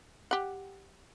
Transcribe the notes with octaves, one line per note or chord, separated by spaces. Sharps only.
G4 F#5